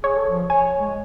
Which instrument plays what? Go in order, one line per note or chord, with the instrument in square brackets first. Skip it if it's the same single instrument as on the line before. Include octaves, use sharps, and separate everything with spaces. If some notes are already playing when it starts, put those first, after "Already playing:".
[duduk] G#4 [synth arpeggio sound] C#5
[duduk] A4
F3
[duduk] C#5 [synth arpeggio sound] G#5
[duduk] G#3